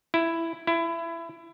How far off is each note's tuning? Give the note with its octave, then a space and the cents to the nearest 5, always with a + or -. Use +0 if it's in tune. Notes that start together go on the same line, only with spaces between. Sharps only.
E4 +10
E4 +25